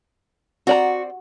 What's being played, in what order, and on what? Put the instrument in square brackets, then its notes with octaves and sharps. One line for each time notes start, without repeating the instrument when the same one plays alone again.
[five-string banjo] C4 D5 A#5 [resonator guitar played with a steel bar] F#4